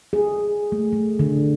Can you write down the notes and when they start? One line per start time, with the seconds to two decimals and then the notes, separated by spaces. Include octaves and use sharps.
0.13 G#4
0.72 A3
0.92 A3
1.19 D3